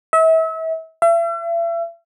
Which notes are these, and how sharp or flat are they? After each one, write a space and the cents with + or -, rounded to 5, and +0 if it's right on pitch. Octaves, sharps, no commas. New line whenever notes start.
E5 -35
E5 +40